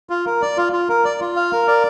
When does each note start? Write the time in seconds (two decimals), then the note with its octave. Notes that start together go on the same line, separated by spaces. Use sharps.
0.10 F4
0.26 A#4
0.42 D5
0.57 F4
0.73 F4
0.89 A#4
1.05 D5
1.21 F4
1.36 F5
1.53 A#4
1.68 D5